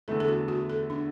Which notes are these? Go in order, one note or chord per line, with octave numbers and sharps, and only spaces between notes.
E2 D3 A3 E4 A4
A4
F#4
F#4
A4
D4